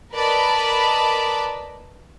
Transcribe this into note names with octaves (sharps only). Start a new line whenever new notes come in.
A#4 B4 D5 D#5 A5 B5